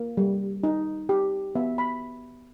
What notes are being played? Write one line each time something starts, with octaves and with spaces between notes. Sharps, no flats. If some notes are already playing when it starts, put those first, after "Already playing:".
Already playing: A#3
G3
D#4
G4
B3 E5
B5